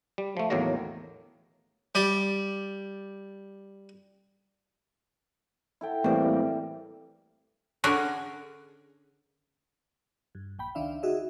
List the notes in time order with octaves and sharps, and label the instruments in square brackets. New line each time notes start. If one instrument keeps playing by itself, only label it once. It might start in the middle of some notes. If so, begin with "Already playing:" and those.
[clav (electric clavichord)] G3
F3 A3
E2 A2 D#3 F#3 A#3 A#5
[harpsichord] G3 D5
[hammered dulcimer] E4 A4 G5
[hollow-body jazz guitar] A2 C4 [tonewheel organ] E3 G3 A#3
[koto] D3 C#4 F#4 G#4 A#4
[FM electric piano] G2
A#1 G5 B5
C#2 D#3 D4 E5 F5
D#4 F#4 G#4 D#5 E5